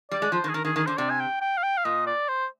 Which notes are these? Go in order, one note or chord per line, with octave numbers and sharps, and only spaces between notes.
G3 D5
G#3
F3 C5
D#3
G#4
D#3 A#4
D#3 G#4
D#3 G#4
D3 C5
C3 D5
G#5
G5
G5
F5
G5
F5
A#2 D#5
D5
C5